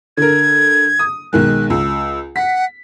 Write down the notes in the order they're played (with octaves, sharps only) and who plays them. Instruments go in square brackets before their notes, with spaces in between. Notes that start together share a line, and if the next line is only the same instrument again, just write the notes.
[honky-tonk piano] D3 A#4 [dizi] G#6
[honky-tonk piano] D#6
[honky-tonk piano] B1 D#3 G#3 [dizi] F#6
[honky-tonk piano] C#2 [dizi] E6
[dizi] F#5 [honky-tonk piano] B6